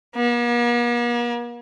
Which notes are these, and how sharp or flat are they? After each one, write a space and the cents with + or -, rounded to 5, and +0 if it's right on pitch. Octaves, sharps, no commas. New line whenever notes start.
A#3 +45